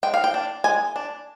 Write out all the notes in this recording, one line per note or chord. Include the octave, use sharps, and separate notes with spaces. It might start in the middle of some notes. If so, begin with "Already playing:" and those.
G#3 G5
F5
G5
D4
G#3 G#5
D4